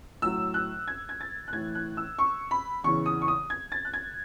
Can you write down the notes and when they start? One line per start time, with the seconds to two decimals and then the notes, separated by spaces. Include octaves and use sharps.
0.22 A2 F#3 E6
0.54 F#6
0.88 G#6
1.09 G#6
1.21 A6
1.48 F#6
1.52 A2 E3 G#6
1.75 F#6
1.97 E6
2.19 C#6
2.51 B5
2.84 E2 C#3 E3 C#6
3.06 D#6
3.22 C#6
3.28 D#6
3.50 G#6
3.72 A6
3.85 F#6
3.94 G#6